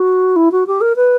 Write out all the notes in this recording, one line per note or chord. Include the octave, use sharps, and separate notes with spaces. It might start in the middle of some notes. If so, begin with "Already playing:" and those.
Already playing: F#4
E4
F#4
G4
A#4
B4